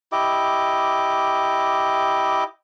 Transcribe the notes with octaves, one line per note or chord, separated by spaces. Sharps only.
E4 G4 D#5 D6